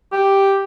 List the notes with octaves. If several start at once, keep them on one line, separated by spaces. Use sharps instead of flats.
G4